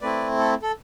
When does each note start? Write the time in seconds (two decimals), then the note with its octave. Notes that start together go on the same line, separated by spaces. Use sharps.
0.01 A3 C4 E4 B4 D5
0.39 A4
0.62 A4